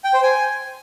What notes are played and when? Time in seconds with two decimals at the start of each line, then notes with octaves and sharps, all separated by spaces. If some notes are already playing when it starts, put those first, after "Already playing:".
0.04 G5
0.14 C5
0.23 G#5